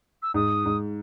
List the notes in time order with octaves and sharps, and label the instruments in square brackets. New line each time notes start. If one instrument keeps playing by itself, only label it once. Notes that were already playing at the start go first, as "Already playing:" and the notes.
[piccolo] E6
[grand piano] G#2 [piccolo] D#6
[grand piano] G#2